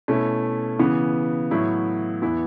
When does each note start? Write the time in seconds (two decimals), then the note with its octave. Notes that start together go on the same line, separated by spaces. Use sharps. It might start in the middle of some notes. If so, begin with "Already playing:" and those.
0.08 B2 A3 C#4 E4
0.79 C#3 E3 B3
1.51 A2 F#3 B3 E4
2.21 E2 E3 B3 E4